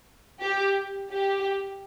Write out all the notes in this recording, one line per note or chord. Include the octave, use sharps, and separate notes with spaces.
G4
G4